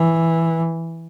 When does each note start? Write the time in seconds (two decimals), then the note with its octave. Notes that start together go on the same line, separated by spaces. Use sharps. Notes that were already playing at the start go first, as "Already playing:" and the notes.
Already playing: E3